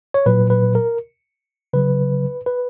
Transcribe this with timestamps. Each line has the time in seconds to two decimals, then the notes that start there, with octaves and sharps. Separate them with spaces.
0.14 C#5
0.26 A#2 F#3 B4
0.50 B4
0.75 A#4
1.73 C#3 F#3 B4
2.46 B4